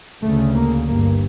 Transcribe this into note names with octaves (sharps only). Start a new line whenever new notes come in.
D2 C#3 A3
A#3
G1 G2 A#3